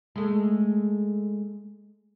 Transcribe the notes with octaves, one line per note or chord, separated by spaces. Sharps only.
G#3 A3